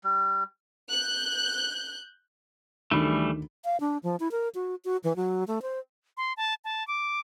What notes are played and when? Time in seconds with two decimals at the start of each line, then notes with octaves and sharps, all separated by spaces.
0.04 G3
0.93 F#6 G6
2.91 D2 D#3 E3 G3 A3 B5
3.65 F5
3.80 D4
4.03 F3
4.20 E4
4.31 A#4
4.55 F#4
4.85 F#4
5.04 E3
5.16 F#3
5.48 A3
5.62 C5
6.17 C6
6.37 A5
6.65 A5
6.88 D6